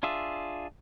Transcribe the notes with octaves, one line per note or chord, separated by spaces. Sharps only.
D4 F4 G#4 E5